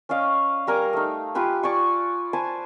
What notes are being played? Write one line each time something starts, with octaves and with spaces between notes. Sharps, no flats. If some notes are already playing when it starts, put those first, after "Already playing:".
C#4 D5 D#5 F5
G3 A#4 G#5 D6
A3 D#4
F4 G4 B4 G#5
D5 G#5 C#6
B4 C5 G#5 A5